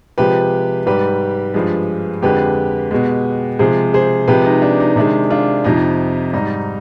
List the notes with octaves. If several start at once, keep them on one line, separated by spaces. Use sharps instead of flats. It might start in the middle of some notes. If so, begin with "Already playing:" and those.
C3 F3 G#3 G4 B4
G#2 G3 G4 B4
G2 F3 G#3
F2 D3 G#3 G4 B4
B2 G#3
C3 F3 G#3 G#4 C5
G#4 C5
C3 F3 G#3 G4 B4
D#4
D4
D#4
C3 D#3 G#3 D4
D4 F4
F2 C3 F3 D#4
G#2 G3 D#4